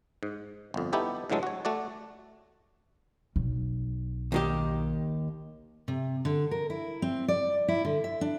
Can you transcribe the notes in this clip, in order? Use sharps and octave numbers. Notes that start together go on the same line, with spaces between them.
G#2
G1 F2
B3 D#4 E4 G4 A4
A2 D3 E3 F#3 G#3 A4
F#4 C#5
A3 F#4 D5
B1
D#2 D#3 G4
C3
D3
A#4
E4
C4
D5
E4
D3
E5
D4